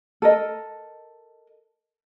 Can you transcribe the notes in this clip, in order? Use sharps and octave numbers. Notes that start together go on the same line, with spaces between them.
A4 A#4 D#5